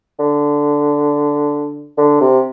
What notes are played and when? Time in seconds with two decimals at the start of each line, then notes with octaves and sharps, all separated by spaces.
0.19 D3
1.98 D3
2.21 C3